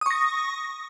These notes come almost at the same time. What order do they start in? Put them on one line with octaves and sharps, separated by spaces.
D#6 C#6 A#6